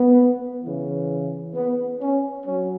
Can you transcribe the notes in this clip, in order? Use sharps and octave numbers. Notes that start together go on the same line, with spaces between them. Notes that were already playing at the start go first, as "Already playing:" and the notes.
Already playing: B3
C#3 E3
B3
C#4
F#3 C#4